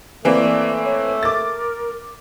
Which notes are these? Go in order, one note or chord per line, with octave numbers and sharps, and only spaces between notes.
E3 A3 A#3 C4 D5
C#5
A#4 D6 A6